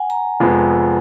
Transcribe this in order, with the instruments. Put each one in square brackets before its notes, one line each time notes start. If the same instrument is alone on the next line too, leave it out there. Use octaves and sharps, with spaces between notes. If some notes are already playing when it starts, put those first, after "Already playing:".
Already playing: [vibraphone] F#5 G#5
A#5
[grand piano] F1 F2 F3 G#3 B3